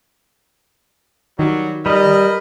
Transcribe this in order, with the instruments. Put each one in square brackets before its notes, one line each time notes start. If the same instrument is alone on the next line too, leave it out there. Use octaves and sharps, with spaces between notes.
[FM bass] D#3 [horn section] F#3 G3
[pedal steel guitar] G3 [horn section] A#4 B4 D#5